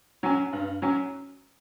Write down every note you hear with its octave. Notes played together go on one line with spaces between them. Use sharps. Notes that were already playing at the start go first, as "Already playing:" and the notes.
F#3 C#4
G2
F#3 C#4